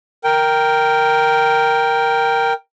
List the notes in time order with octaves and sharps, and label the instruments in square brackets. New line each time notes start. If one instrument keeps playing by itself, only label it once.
[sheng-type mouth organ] A#4 G5